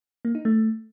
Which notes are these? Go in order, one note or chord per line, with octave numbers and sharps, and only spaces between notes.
A#3
D#4
A3